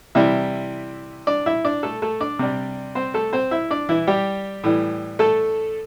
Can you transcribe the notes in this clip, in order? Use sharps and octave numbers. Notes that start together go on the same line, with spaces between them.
C3 E3 G3 E4 E5
D4 D5
E4 E5
D4 D5
A3 A4
A3 A4
D4 D5
C3 G3
C4 C5
A3 A4
C4 C5
E4 E5
D4 D5
E3 E4
G3 G4
A2 E3 G3
A3 A4